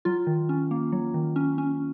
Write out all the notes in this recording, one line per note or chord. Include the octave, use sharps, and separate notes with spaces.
F#3 F4
D#3
C#4
A#3
F#3
D#3
C#4
C#4